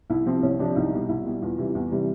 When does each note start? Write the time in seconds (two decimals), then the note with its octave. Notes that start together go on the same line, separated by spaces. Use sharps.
0.10 C2 E4
0.26 C3 F3 C4
0.43 C2 C#4
0.59 C3 F3 D4
0.75 C2 D#4
0.93 B2 G3
1.09 C2 E4
1.26 B2 G3
1.42 E2 F4
1.58 C3 E3 G3
1.75 E2
1.91 C3 E3 G3